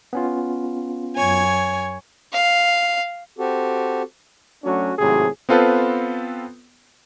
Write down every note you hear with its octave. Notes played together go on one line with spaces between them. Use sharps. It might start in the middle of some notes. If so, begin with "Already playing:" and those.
B3 C#4 F4
F#2 C#5 G#5
F5
C4 F#4 G4 A4
F#3 A3 C#4 D4 F#4
G#1 A2 C3 F#3 G#4
B3 C4 F4 A4 B4 C5